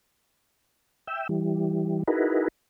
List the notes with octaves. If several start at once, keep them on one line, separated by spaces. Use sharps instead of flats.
E5 G5 E6
E3 G3
D#4 E4 F#4 G#4 A#4 B4